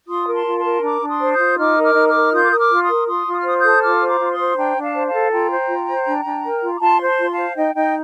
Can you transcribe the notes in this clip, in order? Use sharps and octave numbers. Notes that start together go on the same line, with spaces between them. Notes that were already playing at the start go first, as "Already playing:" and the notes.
F4 C6 D#6
A#4
A5 C6
F4
A5 C6
A#4
D4 A#5 D6
D4
C6 D#6
C5
D#6 G6
F4
D#4 D6 F6
A#4
D6 F6
D#4
D6 F6
A#4
F4 D#6 G6
D6
A#4 D#6
D6 F6
F4
C6 D#6
A#4
F4 C6 D#6
F4
D#6
F6
C5 C6 D#6
D#6 G6
A4
F4 D6 F6
C5
A#5 D6
F4
C6 D#6
C5
D4 G5 A#5
D4
F5 A5
C5
F5 A5
A4
F4 G5 A#5
C5
F4
C5
D4
D4
A#4
F4
D6
F4 A5 C6
C5
A5 C6
F4
F5 A5
C5
D#4 D#5 G5
D#4 D#5 G5